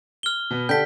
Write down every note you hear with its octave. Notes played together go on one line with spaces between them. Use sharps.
F6 G7
B2 B3
D3 A4 G5 G6 B6